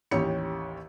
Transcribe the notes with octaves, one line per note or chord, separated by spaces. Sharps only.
A1 D#2 C#4 G4 C#7